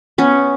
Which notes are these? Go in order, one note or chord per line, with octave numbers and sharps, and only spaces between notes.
B3 C#4